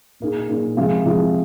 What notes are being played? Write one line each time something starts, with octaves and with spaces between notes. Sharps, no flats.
A#2 A#3 D#4 G#4
A#2 A#3 D#4 G#4
C3 F3 G#3 F4 G#4
C3 F3 G#3 F4 G#4